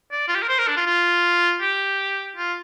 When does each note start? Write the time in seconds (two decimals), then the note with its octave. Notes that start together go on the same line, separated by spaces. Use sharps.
0.12 D5
0.28 F4
0.35 G4
0.42 A#4
0.49 C5
0.58 A#4
0.67 D4
0.77 F4
0.87 F4
1.61 G4
2.36 F4